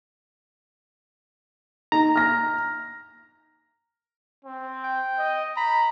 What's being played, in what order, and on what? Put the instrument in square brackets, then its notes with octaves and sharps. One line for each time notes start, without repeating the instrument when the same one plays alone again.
[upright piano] D#4 [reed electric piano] A#5
[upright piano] F6 A#6
[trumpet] C4
[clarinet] G5
[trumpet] D#5
[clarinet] A#5 [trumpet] B5